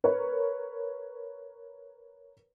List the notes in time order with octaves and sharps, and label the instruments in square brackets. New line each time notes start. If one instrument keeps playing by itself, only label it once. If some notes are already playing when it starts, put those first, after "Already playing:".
[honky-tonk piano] A#4 B4 C#5